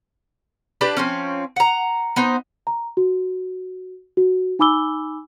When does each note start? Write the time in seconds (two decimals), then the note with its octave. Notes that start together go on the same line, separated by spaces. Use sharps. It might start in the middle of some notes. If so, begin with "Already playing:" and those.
0.81 D4 G4 B4 A5
0.97 F3 C4 C#4
1.56 F#5 A#5
2.16 B3 D#4 C5
2.67 A#5
2.97 F#4
4.17 F#4
4.59 D#4 G#5 B5 D6 E6 G7